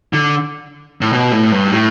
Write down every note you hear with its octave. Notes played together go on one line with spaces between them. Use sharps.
D3
A2
B2
A2
G2
A2